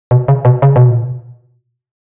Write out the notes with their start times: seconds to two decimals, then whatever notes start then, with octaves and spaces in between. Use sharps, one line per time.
0.11 B2
0.28 C#3
0.45 B2
0.62 C#3
0.76 B2
0.89 A#2
1.04 B2